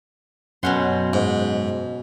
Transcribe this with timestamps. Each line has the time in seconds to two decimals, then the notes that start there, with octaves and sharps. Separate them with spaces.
0.63 F#2 B2 C#4 F#5 C6 G6
1.13 G#2